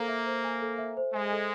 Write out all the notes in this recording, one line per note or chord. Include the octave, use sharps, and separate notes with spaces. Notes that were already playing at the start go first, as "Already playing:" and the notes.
Already playing: A#3 A4 C5 G#5
E5
C5
G#5
A4
E5
C5
G#3 G#5
A4